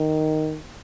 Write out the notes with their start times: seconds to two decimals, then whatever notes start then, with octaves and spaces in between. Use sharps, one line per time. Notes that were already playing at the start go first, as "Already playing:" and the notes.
Already playing: D#3